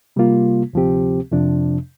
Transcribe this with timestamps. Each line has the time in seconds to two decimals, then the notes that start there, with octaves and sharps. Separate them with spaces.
0.16 C3 G3 A#3 F4
0.73 D2 C3 F3 C4 G4
1.32 F2 C3 F3 D4